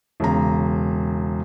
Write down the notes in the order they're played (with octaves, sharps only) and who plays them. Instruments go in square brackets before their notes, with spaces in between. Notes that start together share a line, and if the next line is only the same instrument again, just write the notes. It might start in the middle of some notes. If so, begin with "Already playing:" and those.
[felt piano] E1 C#3 A#5